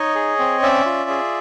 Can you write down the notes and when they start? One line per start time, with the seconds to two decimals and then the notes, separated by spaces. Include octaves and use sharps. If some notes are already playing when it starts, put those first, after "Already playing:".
Already playing: D#4 C#5 D#5
0.15 G#4
0.39 C4
0.63 C#4 D5 E5
0.86 F4
1.10 G#4